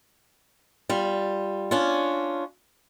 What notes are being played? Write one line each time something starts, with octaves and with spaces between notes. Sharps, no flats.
G3 F4
C#4 D4 F4